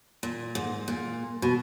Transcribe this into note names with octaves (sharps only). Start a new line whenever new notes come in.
A#2
G#2
A#2
B2